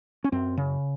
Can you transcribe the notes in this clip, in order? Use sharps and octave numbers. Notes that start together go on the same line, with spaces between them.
C#4
F#2 C4
C#3